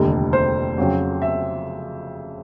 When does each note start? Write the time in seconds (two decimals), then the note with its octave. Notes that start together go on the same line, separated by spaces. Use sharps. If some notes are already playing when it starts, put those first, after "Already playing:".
Already playing: F1 D#2 D3 G3
0.33 C5
0.78 F2 C#3 F#3
1.22 E5